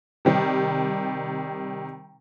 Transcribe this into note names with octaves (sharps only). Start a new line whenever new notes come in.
C3 D#3 G3